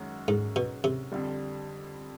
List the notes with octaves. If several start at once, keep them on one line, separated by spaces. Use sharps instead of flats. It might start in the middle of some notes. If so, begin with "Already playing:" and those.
Already playing: F#2 D#3 G#3 C#4 F#4
G#2
B2
C3
F2 D3 G3